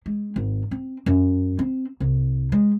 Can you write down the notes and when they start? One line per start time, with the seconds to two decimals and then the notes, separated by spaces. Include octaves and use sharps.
0.06 G#3
0.36 G#1
0.71 C4
1.06 F#2
1.59 C4
2.00 C2
2.52 G#3